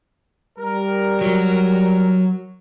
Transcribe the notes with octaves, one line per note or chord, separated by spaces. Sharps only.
G3 A#4
F#3